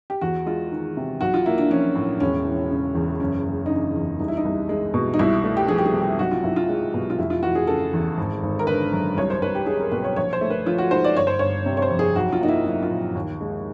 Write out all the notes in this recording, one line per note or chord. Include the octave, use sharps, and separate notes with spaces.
G4
E2 F#4
G#3 F4
D#3
C3
B1 F#4
F4
A#3 E4
D4
F3 C#4
A2
E1 C#4
E3
C#3
E2
F#1 C#4
F#1
D#4
C#3 D4
E2
C2 D#4
E4
D#4
C2
G#3
B2
D#4
C2 E4
A3
G4
F3 G#4
G4
G#4
C3
G4
B1 F#4
F4
B1 E4
F4
G#3
B2
F4
F1 E4
F4
E3 F#4
G#4
C#3 A4
E2
G#1
G#1
A#4
D3 B4
F#2
C2 C#5
C5
C2 B4
G4
G#3 G#4
A#4
B2 B4
C#5
A#1 C#5
C5
A3
B4
F3 F4
F#4
G#2 C5
D5
G1 C#5
C5
G1 C#5
C3
C#5
C5
F2
G#4
B1 F#4
F4
A#3 D#4
E4
F#3 E4
F4
A#2
D#2
G#3